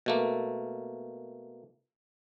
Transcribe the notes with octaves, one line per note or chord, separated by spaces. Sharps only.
B2 A3 A#3